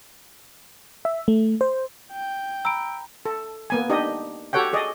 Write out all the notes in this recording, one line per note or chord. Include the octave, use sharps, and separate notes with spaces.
E5
A3
C5
G5
A#5 B5 E6 D7
A4
A#3 B3 G#5
D4 D#4 G4 D#5
F#4 G4 A4 C#5 F#5 G5
G#4 D5 D#5